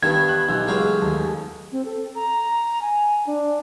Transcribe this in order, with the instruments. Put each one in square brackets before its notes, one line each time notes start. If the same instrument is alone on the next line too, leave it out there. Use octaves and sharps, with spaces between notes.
[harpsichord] G2 D#3 [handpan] B3 G4 B4 [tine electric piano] G#6
[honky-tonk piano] F#6
[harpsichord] B1 [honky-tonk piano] E3 E6 G6 [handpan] D#4 G4
[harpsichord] C#2 F#3 F5 [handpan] G#3
[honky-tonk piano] A3 [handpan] G#4
[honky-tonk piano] D#2 A3
[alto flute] C4
A4
A#5
G#5
D4